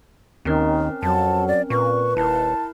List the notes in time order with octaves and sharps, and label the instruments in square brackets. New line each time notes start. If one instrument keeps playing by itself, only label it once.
[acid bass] D#2 [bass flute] D#3 [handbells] C4 C#4 A#4
[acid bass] F2 [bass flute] F#3 [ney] A5
[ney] D5
[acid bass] A#2 [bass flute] B4 [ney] C#6
[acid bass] D#1 [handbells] E4 A#4 [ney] A5